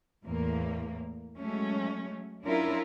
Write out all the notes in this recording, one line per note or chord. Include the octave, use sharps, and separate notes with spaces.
E2 A2 A#3
F#3 G#3 A3 C#4
F#3 C#4 D4 E4 F4 A#4